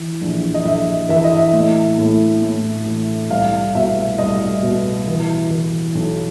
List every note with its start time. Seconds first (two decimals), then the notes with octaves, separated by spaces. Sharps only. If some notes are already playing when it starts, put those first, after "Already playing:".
Already playing: E3
0.22 A#1
0.54 D#5
0.65 A#1 E5
1.09 E3 E5
1.24 D#5
1.37 E5
1.53 A2
1.99 A2
2.42 A2
2.86 A1
3.30 C2 F5
3.75 B2 E5
4.18 C2 D#5
4.63 B2
5.08 E3
5.51 E3
5.95 B1